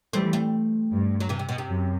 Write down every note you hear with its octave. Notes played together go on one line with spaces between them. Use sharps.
E3 G3 A3 C4
A3 C4
G2
F#3
C3 E3
C3
B2
C3
F#2